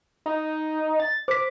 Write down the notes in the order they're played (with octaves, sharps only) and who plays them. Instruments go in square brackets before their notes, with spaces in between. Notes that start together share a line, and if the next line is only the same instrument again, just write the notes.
[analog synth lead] D#4
A6
[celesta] C5 B6 [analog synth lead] D6